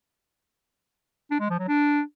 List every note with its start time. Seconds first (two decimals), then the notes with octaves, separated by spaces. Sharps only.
1.31 D4
1.40 G#3
1.50 F3
1.59 F#3
1.68 D4